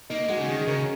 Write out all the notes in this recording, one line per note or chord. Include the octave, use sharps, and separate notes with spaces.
A#3 D#4
G#3 F#4
C#3
D#3 G#4
C#3 A#4